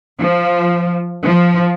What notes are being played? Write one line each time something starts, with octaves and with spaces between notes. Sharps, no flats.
F3
F3